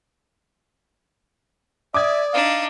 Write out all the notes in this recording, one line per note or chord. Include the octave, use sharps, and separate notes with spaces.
D5 E5 D6 D#6 G#6
D4 D#4 F5